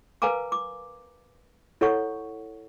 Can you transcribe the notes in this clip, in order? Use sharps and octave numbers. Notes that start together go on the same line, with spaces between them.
A#4 B4 F5 G#5 A#5 D6
D6
E4 A4 C#5 F#5 C#6